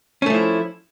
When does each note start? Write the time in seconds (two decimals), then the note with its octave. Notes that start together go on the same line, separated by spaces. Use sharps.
0.22 C#4
0.26 A3
0.30 F3
0.34 E4